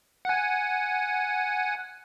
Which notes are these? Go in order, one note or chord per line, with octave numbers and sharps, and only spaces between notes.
F#5 G#5